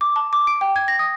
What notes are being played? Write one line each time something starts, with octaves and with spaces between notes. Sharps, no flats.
D6
A5
D6
D7
G5
G#6
A#6
D#6